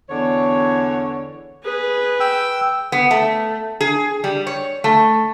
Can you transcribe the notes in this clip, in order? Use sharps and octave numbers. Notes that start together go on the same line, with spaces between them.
E2 D3 C#5
G#4 B4
G5 E6
B3
A3
G#4
G3
C#5
A3